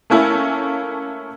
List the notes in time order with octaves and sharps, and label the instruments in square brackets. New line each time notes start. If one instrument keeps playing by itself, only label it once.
[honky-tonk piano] A3 A#3 C#4 E4 A4